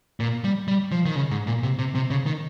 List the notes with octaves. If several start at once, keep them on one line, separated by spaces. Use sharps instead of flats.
A#2
G3
G3
F3
D#3
C#3
G#2
A#2
C3
C3
C3
C#3
D#3